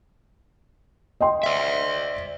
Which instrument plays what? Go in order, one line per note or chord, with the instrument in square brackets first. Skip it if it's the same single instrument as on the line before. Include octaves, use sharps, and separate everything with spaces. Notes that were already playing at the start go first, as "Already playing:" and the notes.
[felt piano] D#5 G5 C6
[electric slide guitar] D5 E5